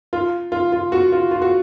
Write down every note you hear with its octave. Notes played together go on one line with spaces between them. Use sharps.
F4
F4
F4
F#4
F4
F4
F#4